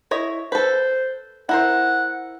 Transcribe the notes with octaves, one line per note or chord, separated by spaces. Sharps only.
E4 C#5 D#5
A4 B4 C5
E4 A#4 C5 F#5